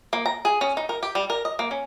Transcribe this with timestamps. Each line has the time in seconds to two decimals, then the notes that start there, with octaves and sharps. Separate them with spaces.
0.13 A#3
0.26 A#5
0.45 G#4
0.61 C#4
0.77 D#4
0.89 A#4
1.03 G4
1.15 G3
1.30 A#4
1.45 D#5
1.59 A#3
1.71 C#4